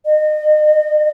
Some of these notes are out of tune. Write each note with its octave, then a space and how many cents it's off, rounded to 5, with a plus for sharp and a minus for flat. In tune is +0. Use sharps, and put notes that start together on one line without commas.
D#5 -35